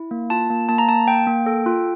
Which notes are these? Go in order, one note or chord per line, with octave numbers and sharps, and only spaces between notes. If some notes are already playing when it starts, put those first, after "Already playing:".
Already playing: E4
A#3
F4 A5
A#3
A#3 A5
A#5
A#3 A5
A#3 G5
A#3
A4
F4